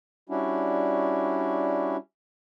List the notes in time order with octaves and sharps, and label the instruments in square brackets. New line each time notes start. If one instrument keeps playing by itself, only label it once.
[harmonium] G3 C#4 D4 E4 F#4